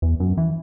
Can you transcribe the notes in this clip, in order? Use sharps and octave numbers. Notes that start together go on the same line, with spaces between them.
E2
F#2
E3